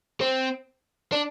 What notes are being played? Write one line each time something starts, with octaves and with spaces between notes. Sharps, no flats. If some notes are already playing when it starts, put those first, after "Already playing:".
C4
D4